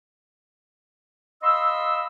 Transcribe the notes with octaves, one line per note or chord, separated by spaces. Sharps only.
D#5 F5 B5 C6 E6